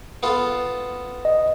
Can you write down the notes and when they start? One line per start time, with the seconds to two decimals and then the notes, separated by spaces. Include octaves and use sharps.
0.23 B3 F4 A4
1.25 D#5